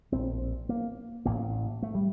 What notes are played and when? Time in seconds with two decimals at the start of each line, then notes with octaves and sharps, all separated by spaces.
0.12 A#1 A2 C4
0.69 A#3
1.25 A1 A2 A#3
1.82 A3
1.95 G3